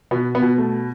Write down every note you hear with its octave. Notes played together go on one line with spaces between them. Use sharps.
B2 B3
B3
B2
A3